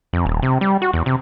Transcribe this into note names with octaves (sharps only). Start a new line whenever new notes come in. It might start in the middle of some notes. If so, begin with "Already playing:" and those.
F2
D#1
C3
G3
F#4
E2
C3